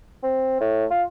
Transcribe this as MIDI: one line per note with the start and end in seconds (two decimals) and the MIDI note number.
0.23 0.58 60
0.60 0.85 45
0.91 1.03 65